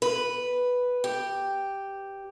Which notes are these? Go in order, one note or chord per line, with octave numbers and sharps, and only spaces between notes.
B4
G4